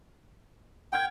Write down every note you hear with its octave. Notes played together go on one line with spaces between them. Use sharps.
F#5 G5 F6 G#6